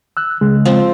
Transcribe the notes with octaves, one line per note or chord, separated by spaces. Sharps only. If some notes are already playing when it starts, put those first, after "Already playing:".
E6 F#6
C#3 G#3
F3 C4